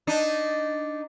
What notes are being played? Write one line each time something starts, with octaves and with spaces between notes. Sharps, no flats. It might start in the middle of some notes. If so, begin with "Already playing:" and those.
D4 D#4